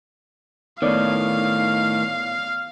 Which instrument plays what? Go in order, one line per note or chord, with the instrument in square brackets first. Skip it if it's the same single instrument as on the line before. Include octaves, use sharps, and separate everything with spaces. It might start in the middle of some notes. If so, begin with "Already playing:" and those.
[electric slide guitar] A2 D#3 [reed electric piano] B3 C#5 D5 [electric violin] F5